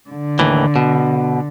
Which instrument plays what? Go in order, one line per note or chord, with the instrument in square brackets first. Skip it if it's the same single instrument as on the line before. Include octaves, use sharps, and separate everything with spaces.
[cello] D3
[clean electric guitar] D#2 A2 E3
B2